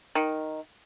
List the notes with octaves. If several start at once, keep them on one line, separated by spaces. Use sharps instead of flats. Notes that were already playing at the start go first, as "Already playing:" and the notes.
D#3